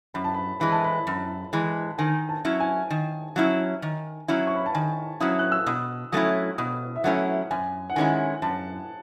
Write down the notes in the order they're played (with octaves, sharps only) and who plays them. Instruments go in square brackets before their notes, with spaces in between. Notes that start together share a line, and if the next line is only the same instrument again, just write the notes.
[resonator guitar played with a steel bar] F#2 [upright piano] B5
[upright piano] A5
B5
[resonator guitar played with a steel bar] E3 G#3 [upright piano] B5
[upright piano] A5
B5
[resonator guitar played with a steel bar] F#2
E3 G#3
[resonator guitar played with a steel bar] D#3 [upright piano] G#5
[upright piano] A5
[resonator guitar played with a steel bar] F#3 C#4 E4
[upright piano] G#5
[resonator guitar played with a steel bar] D#3
F#3 C#4 E4
D#3
F#3 C#4 E4
[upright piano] C#6
B5
A5
[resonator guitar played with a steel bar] D#3 [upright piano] G#5
[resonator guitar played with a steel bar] F#3 C#4 E4 [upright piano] D#6
[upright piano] F#6
E6
[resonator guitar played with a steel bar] B2 [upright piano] D#6
[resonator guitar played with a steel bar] F#3 A3 C#4 E4 [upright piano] D#6
[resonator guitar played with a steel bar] B2 [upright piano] D#6
[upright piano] E5
[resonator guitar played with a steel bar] F#3 A3 C#4 E4 [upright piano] F#5
[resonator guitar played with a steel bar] F#2 [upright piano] G#5
[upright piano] F#5
[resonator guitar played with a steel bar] D#3 G#3 C#4 E4 [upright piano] G#5
[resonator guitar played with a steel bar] F#2 [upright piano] A5